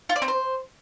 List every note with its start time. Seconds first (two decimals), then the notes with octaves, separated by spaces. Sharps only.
0.09 F4
0.16 D5
0.22 C4
0.28 C5